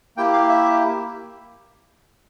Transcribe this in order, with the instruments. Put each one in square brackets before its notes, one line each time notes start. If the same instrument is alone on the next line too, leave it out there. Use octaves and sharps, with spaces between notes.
[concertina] A#3 E4 G4 G5
F5
E5